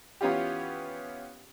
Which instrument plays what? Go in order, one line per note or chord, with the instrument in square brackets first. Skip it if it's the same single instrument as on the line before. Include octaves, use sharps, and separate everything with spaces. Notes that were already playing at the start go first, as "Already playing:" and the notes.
[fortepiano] E3 B3 C#4 F4 G4